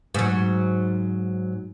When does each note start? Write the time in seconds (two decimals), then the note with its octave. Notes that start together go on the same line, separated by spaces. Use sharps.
0.14 G#2 F#3